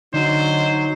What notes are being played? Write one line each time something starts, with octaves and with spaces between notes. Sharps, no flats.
D3 F#3 D#4 C5